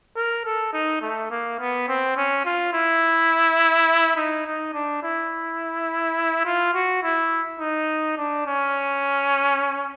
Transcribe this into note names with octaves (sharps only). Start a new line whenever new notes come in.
A#4
A4
D#4
A3
A#3
B3
C4
C#4
F4
E4
D#4
D#4
D4
E4
F4
F#4
E4
D#4
D4
C#4